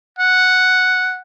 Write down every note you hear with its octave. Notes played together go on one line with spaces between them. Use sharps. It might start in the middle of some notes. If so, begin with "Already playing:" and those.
F#5